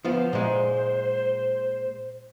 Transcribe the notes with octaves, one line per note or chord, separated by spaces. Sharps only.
F3 B3 F4 C5
A#2 G#3